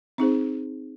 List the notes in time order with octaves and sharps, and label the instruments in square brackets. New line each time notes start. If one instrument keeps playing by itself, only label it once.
[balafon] C4 D#4 G#4 C5